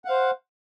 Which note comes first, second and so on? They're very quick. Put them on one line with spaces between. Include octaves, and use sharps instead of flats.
F#5 F5 C5